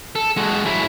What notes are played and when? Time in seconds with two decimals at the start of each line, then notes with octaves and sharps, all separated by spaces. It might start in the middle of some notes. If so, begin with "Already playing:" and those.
0.15 A4
0.37 G#3 F#4
0.65 F#3 E4